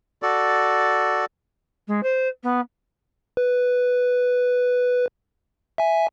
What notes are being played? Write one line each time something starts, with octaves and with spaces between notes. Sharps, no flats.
F#4 A4 D5
G#3
C5
B3
B4
E5 G#5